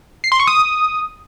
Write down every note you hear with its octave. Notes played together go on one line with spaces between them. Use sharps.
C7
C6
C#6
D#6